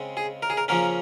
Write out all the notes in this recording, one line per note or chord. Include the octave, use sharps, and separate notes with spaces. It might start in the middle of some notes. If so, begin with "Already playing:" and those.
Already playing: C#3 G#3 C4
G#4
A#4
G#4
A#4
C#3 F3 A#3 C#4 A#4